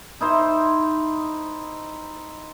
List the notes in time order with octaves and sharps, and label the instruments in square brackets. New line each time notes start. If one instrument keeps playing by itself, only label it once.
[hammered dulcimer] D#4 E4 C5